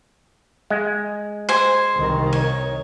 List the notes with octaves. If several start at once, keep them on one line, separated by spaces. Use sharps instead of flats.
G#3
C5 G#5
C2 D#3
C#5